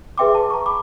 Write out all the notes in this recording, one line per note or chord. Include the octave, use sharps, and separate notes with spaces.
G#4 B4 E5 G5 C6 D6
A5
A#5 C#6
B5 D6